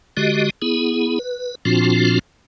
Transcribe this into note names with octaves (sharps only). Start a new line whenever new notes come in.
D3 G#3 F#4 G4 D#5
B3 E4 G#4
B4
A#2 F3 C4 D4 F4 F#4